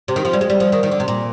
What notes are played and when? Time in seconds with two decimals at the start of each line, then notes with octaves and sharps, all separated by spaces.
0.08 C3
0.16 D#3
0.25 F3
0.33 G3
0.41 G#3
0.50 G3
0.60 F3
0.72 D#3
0.83 D#3
0.91 D3
1.00 C3
1.08 A#2